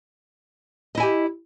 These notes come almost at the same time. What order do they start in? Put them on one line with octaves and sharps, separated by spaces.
D#5 E4 G#5 G4